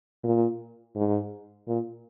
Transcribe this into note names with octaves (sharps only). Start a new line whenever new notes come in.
A#2
G#2
A#2